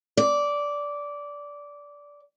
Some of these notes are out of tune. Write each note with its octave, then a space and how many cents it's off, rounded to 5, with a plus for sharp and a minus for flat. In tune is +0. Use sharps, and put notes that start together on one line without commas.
D5 -15